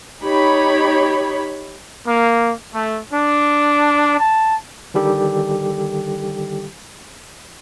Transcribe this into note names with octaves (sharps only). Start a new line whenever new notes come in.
D#4 G4 C#5 B5
A#3
A3
D4
A5
D3 D#3 G3 G4 A4